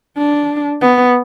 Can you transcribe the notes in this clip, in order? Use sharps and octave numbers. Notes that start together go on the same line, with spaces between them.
D4
B3